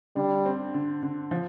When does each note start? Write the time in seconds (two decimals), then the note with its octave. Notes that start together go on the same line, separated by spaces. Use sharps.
0.16 D3 G3
0.45 C4
0.74 D3
1.03 D3
1.31 F3